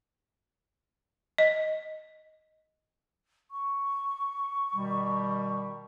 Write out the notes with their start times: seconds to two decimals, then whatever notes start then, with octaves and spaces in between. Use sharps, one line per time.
1.38 D#5
3.51 C#6
4.75 B2 D#3 G3